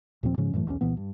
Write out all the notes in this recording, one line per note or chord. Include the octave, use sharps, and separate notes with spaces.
D#2 A#2 F3 C4
G#2 C#3 F3 C#4
F#2 A2 E3 A3
B1 E2 F#3 C#4
C2 A#2 E3 B3
G2